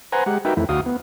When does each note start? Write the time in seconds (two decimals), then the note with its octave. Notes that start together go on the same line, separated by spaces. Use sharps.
0.12 B4 C5 F#5 G#5 A#5
0.26 G#3 G4 F#5
0.45 D#4 F#4 A#4 B4 E5 G5
0.57 F2 E3 A3 E4
0.69 D2 F#4 F5 D#6
0.86 B3